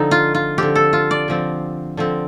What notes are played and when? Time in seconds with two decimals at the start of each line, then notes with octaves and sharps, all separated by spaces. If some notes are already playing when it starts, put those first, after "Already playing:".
Already playing: D3 F3 C4 D#4
0.11 F4
0.35 F4
0.58 D3 F3 C4 G4
0.75 A4
0.93 F4
1.11 D5
1.28 D3 F3 C4
1.97 D3 F3 C4